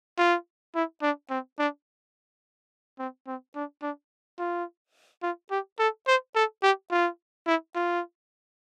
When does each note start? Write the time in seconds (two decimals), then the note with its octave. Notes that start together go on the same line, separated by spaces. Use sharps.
0.18 F4
0.75 E4
1.02 D4
1.30 C4
1.59 D4
2.99 C4
3.27 C4
3.55 D4
3.82 D4
4.39 F4
5.22 F4
5.51 G4
5.79 A4
6.07 C5
6.35 A4
6.63 G4
6.91 F4
7.47 E4
7.75 F4